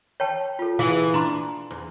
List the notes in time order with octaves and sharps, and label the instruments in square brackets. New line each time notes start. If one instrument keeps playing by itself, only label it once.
[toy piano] C#5 G5 A5
F4 A4
[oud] E3 G#4 [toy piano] F5
[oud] D4 [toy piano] A#5 C6
[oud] E2